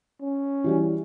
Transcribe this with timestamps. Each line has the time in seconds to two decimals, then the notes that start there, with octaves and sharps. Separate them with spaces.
0.22 C#4
0.64 E3 G3 F#4